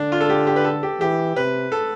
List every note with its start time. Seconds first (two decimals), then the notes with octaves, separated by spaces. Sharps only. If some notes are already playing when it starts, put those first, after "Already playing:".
Already playing: D3 D4
0.12 F4
0.21 A4
0.29 G4
0.47 G4
0.56 B4
0.64 A4
0.83 G4
1.00 E3 G4
1.36 C3 B4
1.72 A4